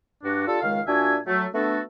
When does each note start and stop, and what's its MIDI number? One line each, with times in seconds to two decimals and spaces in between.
0.23 0.42 43
0.23 0.42 62
0.23 0.42 66
0.46 0.58 62
0.46 0.58 65
0.46 0.58 67
0.46 0.58 69
0.61 0.80 37
0.61 0.80 51
0.61 0.80 56
0.61 0.80 77
0.87 1.16 46
0.87 1.16 62
0.87 1.16 66
0.87 1.16 76
0.87 1.16 80
1.26 1.46 54
1.26 1.46 57
1.54 1.81 57
1.54 1.81 59
1.54 1.81 62
1.54 1.81 66
1.54 1.81 69